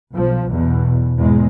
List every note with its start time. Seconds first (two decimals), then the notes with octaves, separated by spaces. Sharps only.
0.14 B1 F3
0.49 B1 E2 B2
1.17 E2 G#2 B2 G#3